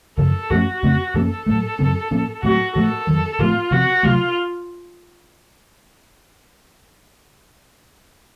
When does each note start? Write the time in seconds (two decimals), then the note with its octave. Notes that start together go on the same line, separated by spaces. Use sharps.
0.18 F#2 C#3 F3 A4
0.50 F#2 F3 A3 C#4 F#4
0.83 F2 C#3 A3 C4
1.14 F#2 F3 A#3 C#4 A4
1.46 A2 F#3 A3
1.79 F#2 C#3 F#3 C4
2.11 A2 F3 A#3 C#4
2.43 A2 F#3 A3 C4 F#4
2.75 A2 F3 A3 A4
3.07 F2 D#3 F#3
3.39 A2 F3 A3 C4 F4
3.71 C3 F3 C4 F#4
4.03 C3 F#3 A3 F4